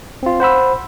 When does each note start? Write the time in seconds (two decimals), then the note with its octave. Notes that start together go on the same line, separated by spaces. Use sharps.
0.23 C4 F4
0.40 C5 F#5 B5 E6